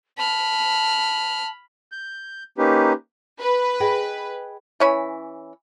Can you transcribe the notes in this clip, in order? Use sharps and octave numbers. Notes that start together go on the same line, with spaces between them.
A5 B5 F6
G6
A#3 C#4 D#4 G4 B4
B4
G#4 D#5 G5
E3 C#4 B5